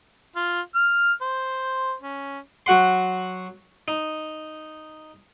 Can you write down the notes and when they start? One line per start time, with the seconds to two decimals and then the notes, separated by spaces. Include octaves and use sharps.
0.36 F4
0.75 F6
1.22 C5
2.01 C#4
2.66 F#3 F#4 F#5 C6
3.88 D#4